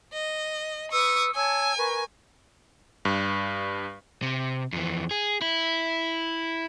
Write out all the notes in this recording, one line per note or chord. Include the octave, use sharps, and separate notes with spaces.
D#5
B4 C#6 D#6 E6
C#5 G#5 A5 E6
A#4 B4 C#6
G2
C3
F2 E3
G#4
E4